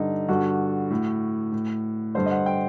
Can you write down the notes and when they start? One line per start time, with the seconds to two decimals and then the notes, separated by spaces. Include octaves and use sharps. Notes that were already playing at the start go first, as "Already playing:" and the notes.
Already playing: G2 D3 D#4
0.29 G2 D3 F#4
0.90 A2
1.52 A2
2.15 G2 D3 C5
2.26 D#5
2.31 F#5
2.46 G5